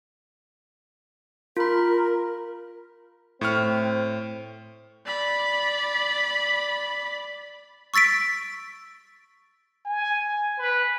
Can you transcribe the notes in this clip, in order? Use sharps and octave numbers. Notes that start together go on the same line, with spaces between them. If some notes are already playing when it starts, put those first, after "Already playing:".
F4 A#4 B5
A2 C4 C#6 F6
D5 B5
C#6 E6 A6 B6 D7
G#5
B4